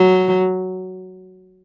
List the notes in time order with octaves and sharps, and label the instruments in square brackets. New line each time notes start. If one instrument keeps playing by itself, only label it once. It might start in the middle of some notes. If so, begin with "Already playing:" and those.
Already playing: [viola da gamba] F#3